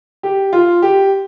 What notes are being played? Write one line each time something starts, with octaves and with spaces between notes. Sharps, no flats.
G4
F4
G4